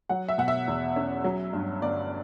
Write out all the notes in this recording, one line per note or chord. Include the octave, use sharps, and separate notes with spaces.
F#3 F#5
E5
B2 F#5
E5
E2
C#4
F#3
G2
G1 D5